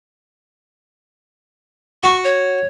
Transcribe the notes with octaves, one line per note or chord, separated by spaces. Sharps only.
F#4 C#6
C#5